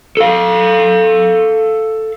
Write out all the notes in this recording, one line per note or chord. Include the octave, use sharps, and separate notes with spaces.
A4 F5